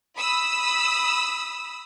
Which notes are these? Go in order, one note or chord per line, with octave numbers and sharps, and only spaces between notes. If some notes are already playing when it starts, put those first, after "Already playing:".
B5 D#6 E6